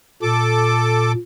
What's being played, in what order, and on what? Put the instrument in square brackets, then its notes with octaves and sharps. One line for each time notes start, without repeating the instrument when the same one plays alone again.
[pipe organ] A#2 [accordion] A4 D6